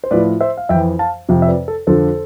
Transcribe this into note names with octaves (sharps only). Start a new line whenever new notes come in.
C5
A2 F3 B4 D5
C5 E5
F5
F2 E5 G5
E3
F5 A5
F2 C3 F3
E5
B4 D5
A4
F2 D3 F3 A4 C5